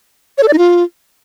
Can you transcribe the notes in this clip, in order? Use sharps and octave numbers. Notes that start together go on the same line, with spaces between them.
C#5
A4
D5
D#4
F4